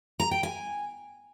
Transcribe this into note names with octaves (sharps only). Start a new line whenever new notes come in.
A#5
G5
G#5